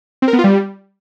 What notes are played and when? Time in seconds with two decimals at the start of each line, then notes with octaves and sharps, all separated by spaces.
0.22 C4
0.28 A#4
0.33 B3
0.39 F4
0.44 G3